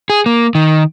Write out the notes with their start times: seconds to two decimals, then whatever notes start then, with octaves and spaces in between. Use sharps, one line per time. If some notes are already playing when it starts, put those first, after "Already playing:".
0.10 G#4
0.26 A#3
0.55 D#3